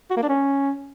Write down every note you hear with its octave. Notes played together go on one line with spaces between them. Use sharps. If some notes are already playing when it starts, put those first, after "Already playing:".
F#4
A#3
D4
C#4